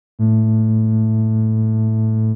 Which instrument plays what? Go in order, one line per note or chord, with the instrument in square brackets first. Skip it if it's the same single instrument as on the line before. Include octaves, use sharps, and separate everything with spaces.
[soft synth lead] A2